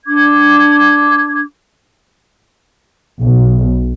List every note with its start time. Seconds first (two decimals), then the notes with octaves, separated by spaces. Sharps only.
0.06 D4 D6 G#6
3.21 B1